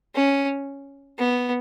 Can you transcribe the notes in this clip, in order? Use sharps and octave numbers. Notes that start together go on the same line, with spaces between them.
C#4
B3